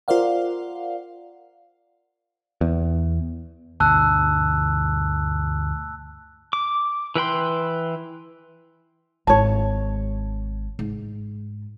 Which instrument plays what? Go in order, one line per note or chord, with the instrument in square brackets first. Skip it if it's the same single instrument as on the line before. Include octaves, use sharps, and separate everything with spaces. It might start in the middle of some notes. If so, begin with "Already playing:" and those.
[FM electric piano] F4 A#4 C5 D5 F5 F#5
[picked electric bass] E2
[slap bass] D2 G2 B2 [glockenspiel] A5 E6 F#6
[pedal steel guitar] D6
E3 B4 G5 C6
[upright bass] G#1 E4 [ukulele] C#5 A5
[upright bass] G#2